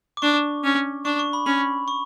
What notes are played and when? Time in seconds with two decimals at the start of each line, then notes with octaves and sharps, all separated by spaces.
0.17 D6
0.22 D4 C#6
0.64 C#4
1.05 D4 C#6
1.19 C#6
1.33 B5
1.46 C#4 B5
1.88 C#6